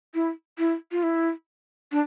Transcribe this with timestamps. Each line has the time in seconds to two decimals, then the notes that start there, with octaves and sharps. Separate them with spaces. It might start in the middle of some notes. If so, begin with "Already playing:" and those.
0.14 E4
0.59 E4
0.92 F4
1.03 E4
1.92 D4